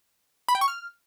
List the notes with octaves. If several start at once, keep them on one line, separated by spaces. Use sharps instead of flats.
B5
G5
C#6
F6